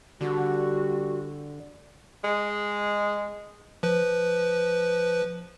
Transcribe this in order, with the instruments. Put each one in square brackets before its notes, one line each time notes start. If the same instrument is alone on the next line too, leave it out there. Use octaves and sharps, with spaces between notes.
[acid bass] D3 [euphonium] G3 [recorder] F#4
[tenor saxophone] G#3
[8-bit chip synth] F3 B4